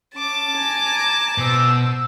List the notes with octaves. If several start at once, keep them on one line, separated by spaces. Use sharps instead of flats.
C#4 A5 D6
G#5 A#5
B2 C5 E6